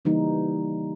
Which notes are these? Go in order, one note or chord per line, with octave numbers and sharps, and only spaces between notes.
C#3 E3 G3 A#3 D#4